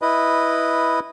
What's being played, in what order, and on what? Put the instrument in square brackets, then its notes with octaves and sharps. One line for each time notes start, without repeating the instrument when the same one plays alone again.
[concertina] E4 B4 D#5